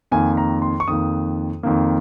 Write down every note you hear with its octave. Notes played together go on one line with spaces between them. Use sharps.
F2 D#3 A#3 G#5
A#5
C6
C#6
F2 D#3 A#3 D#6
F2 D#3 A#3